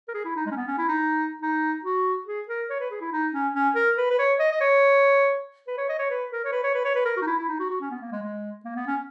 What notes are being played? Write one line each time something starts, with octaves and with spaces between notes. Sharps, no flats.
A#4
G#4
E4
D#4
G#3
C#4
B3
C#4
E4
D#4
D#4
F#4
G#4
A#4
C#5
B4
G#4
E4
D#4
C#4
C#4
A#4
B4
B4
C#5
D#5
D#5
C#5
B4
C#5
D#5
C#5
B4
A#4
C#5
B4
C#5
B4
C#5
B4
A#4
F#4
D#4
E4
E4
D#4
F#4
F#4
C#4
B3
A#3
G#3
G#3
A#3
B3
C#4